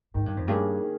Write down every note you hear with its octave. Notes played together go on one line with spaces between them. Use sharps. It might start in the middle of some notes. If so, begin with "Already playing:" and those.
G#2 D#3
G2
F2
G2 A#3 C#4 G#4
D#3